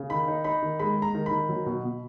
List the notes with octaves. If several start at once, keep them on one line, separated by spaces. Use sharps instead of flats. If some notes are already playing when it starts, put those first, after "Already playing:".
Already playing: C#3
D#3 B5
D#4
D#4 B5
D#3
G#3 B5
G#3
A#5
D#3
B5
D#3
F#3
B2
B2